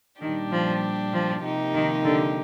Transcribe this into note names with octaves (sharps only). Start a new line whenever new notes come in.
A#2 D#3 G3 D4 G4
F3
F3
C3 F3 A#3 D#4 G4
D#3
D3